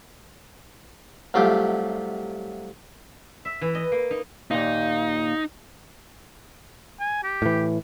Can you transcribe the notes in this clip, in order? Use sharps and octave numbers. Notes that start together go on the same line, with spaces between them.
C2 F#3 A3 F4 G4
E5
E3
D#5
A#3
D#4
D#2 A#2 D#4 F5
G#5
G4
A2 E3